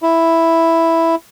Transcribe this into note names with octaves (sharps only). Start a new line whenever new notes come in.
E4